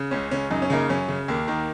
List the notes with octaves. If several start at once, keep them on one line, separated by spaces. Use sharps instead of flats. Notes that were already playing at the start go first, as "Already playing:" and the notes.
Already playing: C#3
C#2 C#4
C#3 C#4
F#2 D#4
C#4
C#3 A#3 D#4
F#2 C#4
C#3
D#2 A#3
D#3